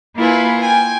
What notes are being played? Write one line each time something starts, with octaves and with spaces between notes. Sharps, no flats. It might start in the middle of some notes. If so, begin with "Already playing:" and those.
A#3 E4 F4 G#4 B4
G5 G#5